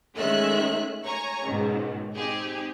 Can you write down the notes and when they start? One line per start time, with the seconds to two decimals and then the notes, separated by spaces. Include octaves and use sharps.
0.16 D#3 G#3 A3 C#4 E5 F#6
1.05 C#5 G#5 A#5 C#6
1.44 C#2 G#2 B2 D#3
2.15 C4 D#4 G4 G#4